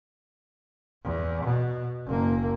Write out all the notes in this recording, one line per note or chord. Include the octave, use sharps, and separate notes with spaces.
E2
B2
F#1 A#3